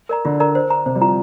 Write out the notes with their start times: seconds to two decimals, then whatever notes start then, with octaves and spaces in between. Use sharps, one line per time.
0.09 A#4 D5 A#5
0.25 D3 F4
0.40 A#4 D5 A#5
0.55 C5
0.70 A#5
0.86 C3 C5
0.95 G3
1.01 F3 A#5